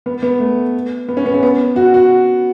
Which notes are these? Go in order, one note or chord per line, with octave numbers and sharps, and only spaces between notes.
B3
B3
A3
B3
C#4
B3
C#4
B3
F#4
F#4